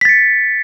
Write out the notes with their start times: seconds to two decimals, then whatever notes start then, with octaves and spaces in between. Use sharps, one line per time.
0.01 B6
0.05 A6
0.09 C#7